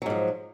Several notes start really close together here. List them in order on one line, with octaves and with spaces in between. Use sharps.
F#3 G#2 F3